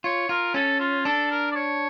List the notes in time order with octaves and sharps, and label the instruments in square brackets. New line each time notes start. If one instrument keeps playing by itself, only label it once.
[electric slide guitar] F4 [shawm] C#5
[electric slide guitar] F4 [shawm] A#4
[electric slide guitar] C#4 [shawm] A4
[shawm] F4
[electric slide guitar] D4 [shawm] A4
[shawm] A#4
D5
C#5